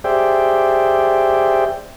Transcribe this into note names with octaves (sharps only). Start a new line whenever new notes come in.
G4 G#4 C5 D5 E5 G5